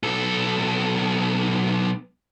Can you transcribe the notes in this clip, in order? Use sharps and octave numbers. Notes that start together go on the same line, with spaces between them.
B1 A4